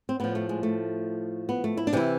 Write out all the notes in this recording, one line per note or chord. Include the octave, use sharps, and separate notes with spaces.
C4
A2 F3 B3
A3
G#3
A3
B3
A3
E4
D4
C3 E3 E4